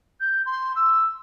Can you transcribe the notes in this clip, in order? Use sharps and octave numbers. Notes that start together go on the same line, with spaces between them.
G6
C6
E6